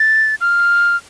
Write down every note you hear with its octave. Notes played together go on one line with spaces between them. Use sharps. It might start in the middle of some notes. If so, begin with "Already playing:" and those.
Already playing: A6
F6